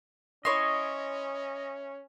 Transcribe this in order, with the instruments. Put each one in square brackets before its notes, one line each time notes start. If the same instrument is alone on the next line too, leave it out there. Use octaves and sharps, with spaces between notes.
[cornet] C#4 [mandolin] E4 C#5 C6 [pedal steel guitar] D#5